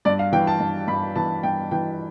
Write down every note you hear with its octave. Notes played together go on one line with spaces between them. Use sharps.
G2 D5
F5
E3 G5
A5
G2
G2 B5
E3 A5
G2 G5
E3 G5